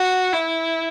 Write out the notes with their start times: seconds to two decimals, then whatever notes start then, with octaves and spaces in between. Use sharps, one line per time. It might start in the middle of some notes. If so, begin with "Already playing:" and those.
Already playing: F#4
0.33 E4